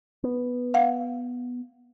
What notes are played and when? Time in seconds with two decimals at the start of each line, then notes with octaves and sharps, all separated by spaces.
0.24 B3
0.74 F5 F#5